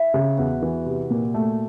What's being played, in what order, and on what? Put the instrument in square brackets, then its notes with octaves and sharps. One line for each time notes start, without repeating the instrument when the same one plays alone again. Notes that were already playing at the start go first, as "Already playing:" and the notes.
Already playing: [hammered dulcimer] E4
[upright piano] C#3
[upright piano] E2 [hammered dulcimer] F#4
[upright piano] E3
C3
A#2
A3